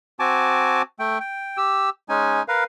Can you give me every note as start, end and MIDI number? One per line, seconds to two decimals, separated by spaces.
0.20 0.82 60
0.20 0.82 66
0.20 0.82 80
0.20 0.82 81
0.20 0.82 86
0.99 1.18 57
0.99 1.18 79
1.20 1.57 79
1.57 1.90 67
1.57 1.90 88
2.09 2.43 56
2.09 2.43 61
2.09 2.43 63
2.09 2.43 80
2.48 2.64 70
2.48 2.64 71
2.48 2.64 77